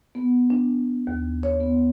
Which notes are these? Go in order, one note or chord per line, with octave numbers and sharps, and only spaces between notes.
B3
D4
D#2
C#5
B3